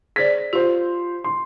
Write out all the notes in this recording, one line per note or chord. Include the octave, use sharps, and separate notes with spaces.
G#4 C5 D5 B6
F4 G4 C5
C6